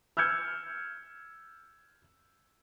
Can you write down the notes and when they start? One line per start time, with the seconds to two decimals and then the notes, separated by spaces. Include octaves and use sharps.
0.17 E6 F6 G6 G#6 C#7